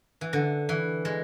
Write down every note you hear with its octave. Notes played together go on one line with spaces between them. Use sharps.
E3
D3
E3
G#3